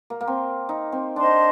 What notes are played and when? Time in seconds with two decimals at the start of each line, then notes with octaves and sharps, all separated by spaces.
0.10 A#3
0.21 A#3
0.28 C4
0.69 D#4
0.92 C4
1.16 D4 C5 D#5 A5 C6